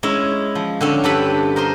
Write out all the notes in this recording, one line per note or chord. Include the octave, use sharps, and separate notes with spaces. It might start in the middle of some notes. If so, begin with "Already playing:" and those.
G#3 C#4 E4
F3
D3 C4 C#4
G2 G4 A4 B4 B5
A#4 C5 D#5 C6